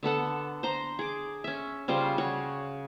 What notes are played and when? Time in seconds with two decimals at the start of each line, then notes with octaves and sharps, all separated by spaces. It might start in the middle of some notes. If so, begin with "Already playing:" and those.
0.03 D3 B3 A4 F#5
0.63 C5 A#5
0.99 G#4 D6
1.44 C#4 E5
1.88 C#3 G3 F4 C5
2.18 F#4 C#5 F#5